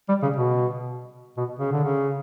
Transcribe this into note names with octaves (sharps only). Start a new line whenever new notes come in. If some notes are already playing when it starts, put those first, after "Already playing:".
G3
C#3
B2
B2
C#3
D3
C#3